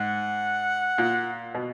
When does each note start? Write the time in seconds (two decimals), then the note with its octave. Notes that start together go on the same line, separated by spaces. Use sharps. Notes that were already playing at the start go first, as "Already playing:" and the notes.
Already playing: G#2 F#5
0.98 A#2
1.55 B2